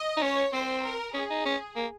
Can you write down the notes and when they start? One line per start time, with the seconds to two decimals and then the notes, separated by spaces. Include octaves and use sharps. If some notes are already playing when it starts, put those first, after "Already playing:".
Already playing: D#5
0.17 D#4
0.22 C#4 C#5
0.53 C4 C5
0.83 A#4
1.14 C#4 G#4
1.30 D#4
1.46 C#4
1.76 A#3